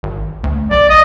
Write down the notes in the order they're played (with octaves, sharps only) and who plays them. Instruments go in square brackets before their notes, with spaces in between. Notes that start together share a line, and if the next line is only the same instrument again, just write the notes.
[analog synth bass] G#1
D2
[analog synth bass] B1 [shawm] D5
[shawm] D#5